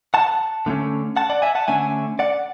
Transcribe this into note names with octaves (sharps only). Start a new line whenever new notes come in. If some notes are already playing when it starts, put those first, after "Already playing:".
F#5 A5
D3 A3 C#4
F#5 A5
D5 F#5
E5 G#5
F#5 A5
D3 A3 C#4 E5 G#5
D5 F#5